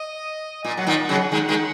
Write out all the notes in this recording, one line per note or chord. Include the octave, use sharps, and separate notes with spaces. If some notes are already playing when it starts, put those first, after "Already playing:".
Already playing: D#5
A#2 G#5
F#3 F#5
A#2 D#3
D#5
F#5
C#3 F#3
D#3 G#3
D#3 G#3